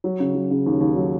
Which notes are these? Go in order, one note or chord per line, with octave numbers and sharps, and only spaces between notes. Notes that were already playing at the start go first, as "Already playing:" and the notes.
F#3
C#3
F#3
C#3
D#2
D#2
F#3